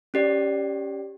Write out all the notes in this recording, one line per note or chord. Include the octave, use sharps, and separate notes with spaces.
C#4 G4 D5